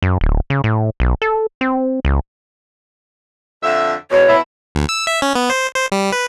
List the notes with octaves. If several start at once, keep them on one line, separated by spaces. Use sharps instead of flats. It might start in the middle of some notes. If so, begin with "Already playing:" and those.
F#2
D1
C#3
A2
B1
A4
C4
C#2
F2 D3 E5
E2 B2 C#5
B2 E4
D2
E6
E5
C#4
B3
C5
C5
G3
B4